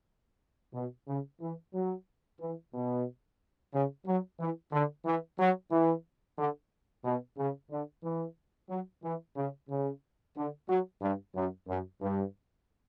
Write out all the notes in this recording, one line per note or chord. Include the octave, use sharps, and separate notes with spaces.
B2
C#3
E3
F#3
E3
B2
C#3
F#3
E3
D3
E3
F#3
E3
D3
B2
C#3
D3
E3
F#3
E3
C#3
C#3
D3
F#3
G2
F#2
F#2
G2